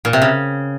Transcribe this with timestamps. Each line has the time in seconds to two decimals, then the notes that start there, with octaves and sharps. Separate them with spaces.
0.05 A#2
0.13 C3
0.22 C#3